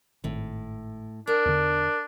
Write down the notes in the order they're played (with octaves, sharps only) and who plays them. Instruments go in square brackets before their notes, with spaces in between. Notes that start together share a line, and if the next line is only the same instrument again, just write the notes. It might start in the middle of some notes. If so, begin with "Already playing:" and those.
[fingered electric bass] G#1 [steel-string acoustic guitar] A2
[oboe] D4 [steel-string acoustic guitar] A#4 G5
[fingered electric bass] E2 D3